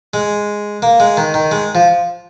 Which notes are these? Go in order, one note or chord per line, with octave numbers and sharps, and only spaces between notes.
G#3
A#3
G#3
D#3
D#3
G#3
F3